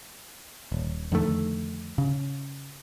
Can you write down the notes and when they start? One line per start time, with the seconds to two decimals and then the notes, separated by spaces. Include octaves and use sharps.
0.72 D#1
1.12 F2 D3 D#3 A3
1.98 C#3